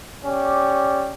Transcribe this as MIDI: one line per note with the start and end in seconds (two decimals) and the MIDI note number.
0.24 1.12 61
0.24 1.12 67
0.24 1.12 74